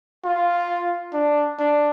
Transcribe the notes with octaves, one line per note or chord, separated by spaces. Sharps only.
F4
D4
D4